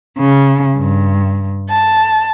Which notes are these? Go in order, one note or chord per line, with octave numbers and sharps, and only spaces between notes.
C#3
G2
A5